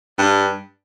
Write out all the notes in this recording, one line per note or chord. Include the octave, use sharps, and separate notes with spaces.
G2